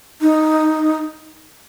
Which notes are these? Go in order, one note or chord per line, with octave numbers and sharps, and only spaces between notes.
D#4